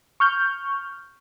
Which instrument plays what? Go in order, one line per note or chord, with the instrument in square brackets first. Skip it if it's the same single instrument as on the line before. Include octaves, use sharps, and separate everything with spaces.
[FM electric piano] C#6 F6 G6